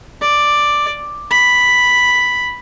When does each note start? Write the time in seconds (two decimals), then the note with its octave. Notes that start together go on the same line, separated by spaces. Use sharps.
0.21 D5
1.31 B5